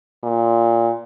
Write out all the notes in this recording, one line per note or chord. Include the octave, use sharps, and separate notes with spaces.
A#2